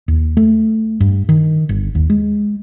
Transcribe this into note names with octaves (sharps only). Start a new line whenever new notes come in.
D#2
A3
G2
D#3
G1
D#2
G#3